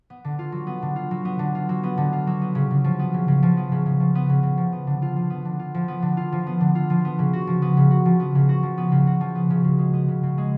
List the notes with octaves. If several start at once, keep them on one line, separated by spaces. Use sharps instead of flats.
B3
D3
F4
F#3
B3
D3
F4
F#3
B3
D3
F4
F#3
B3
D3
F4
F#3
B3
C#3
C#3
F3
B3
C#3
C#3
F3
B3
C#3
C#3
F3
B3
C#3
C#3
F3
B3
D3
F4
F3
B3
D3
F4
F3
B3
D3
F4
F3
B3
D3
F4
F3
B3
C#3
F#4
F3
B3
C#3
F#4
F3
B3
C#3
F#4
F3
B3
C#3
F#4
F3
B3
C#3
C#3
G#3
B3
C#3
C#3
G#3